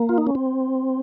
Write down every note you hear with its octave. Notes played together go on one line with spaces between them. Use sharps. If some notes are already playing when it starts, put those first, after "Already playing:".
Already playing: A#3
F4
D#4
C#4
C4